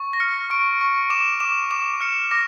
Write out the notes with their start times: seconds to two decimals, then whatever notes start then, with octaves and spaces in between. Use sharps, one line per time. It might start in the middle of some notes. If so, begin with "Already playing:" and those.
Already playing: C#6
0.13 A#6
0.20 F6 C#7
0.50 C#6 D7
0.81 C#6
1.10 D6 E7
1.40 D6 E7
1.71 D6 E7
2.00 F6 C#7
2.31 D6 A#6